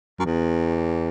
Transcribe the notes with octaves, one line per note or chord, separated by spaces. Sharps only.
F#2
E2